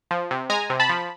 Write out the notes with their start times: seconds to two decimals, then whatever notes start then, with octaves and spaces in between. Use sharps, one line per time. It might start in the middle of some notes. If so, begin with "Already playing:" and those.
0.11 F3
0.31 C3
0.50 G#3 G#5 A#5
0.70 C3
0.80 A5 B5
0.89 F3